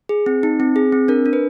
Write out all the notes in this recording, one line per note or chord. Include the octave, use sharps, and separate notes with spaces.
G#4
C4
D#4
C4
G#4
C4
D4 A#4
D4
B4